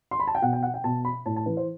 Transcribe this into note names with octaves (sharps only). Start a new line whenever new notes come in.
C6
B5
A5
G5
B2 F#5
G5
F#5
G5
B2 A5
B5
A2 A5
A5
E3 B4
C5